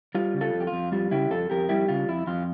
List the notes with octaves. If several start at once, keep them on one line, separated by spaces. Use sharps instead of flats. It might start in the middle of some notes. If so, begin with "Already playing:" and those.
G3 F4
C#3
F4 A4
F2
G4
F4
F2
G3 F4
C#3 E4 G4
F2 F4 A4
F2 G4 A#4
G3 E4 G4
C#3 F4
F2 E4
F2 F4